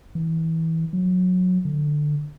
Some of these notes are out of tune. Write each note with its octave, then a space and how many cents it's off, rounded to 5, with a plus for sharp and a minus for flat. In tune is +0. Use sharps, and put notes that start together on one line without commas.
E3 -25
F#3 -20
D3 +15